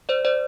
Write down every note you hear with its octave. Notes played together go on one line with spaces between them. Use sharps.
C5 D5
C5 D5